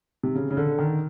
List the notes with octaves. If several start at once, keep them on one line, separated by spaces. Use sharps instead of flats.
C3
C#3
C#3
D3
D#3